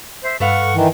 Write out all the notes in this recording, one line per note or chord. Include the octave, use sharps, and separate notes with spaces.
C5 E5
G2 A4 B4 F5 F#5 C#6
D#3 E3